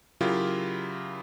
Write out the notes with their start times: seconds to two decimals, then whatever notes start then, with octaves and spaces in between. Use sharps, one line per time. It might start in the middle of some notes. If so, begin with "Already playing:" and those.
0.21 C#3 F#3 E4 F4 G4 A#4